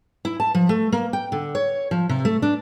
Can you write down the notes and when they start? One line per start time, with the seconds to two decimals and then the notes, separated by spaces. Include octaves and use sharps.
0.25 E4
0.40 A5
0.55 F3
0.69 A3
0.92 A#3
1.13 G5
1.32 D3
1.55 C#5
1.91 F3
2.09 C3
2.25 A3
2.42 D4